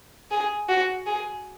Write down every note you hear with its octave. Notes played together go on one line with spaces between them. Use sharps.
G#4
F#4
G#4